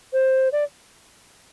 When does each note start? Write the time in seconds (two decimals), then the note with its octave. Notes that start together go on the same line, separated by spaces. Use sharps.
0.13 C5
0.52 D5